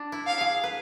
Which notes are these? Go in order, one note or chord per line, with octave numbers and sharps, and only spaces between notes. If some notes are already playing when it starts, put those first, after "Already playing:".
Already playing: D4
E4
F5
G#4
B4